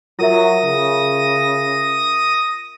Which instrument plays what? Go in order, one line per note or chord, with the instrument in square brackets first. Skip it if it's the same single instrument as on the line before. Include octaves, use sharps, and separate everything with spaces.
[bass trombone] F#3 [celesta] F4 A#4 E5 [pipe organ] D#6 A#6
[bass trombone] C#3